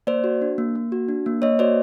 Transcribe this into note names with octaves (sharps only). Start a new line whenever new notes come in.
A#3 C5 D5
F#4
D4
A#3
A#3
F#4
D4
A#3
A#3 C#5 D#5
F#4 C5 D5